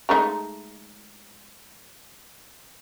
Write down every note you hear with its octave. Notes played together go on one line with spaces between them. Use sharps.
G#3 A3 D#4